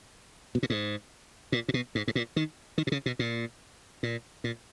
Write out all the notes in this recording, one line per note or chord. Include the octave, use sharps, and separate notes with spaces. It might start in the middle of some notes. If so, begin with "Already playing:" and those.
B2
A#2
G#2
A#2
A#2
B2
G#2
G#2
A#2
D#3
D#3
B2
C#3
B2
A#2
A#2
A#2